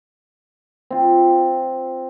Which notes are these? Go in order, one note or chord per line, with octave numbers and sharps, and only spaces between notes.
C4 F4